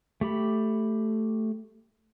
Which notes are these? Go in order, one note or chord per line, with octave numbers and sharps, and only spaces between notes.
A3 G4 B5